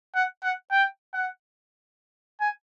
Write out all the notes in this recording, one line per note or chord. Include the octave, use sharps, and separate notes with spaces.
F#5
F#5
G5
F#5
G#5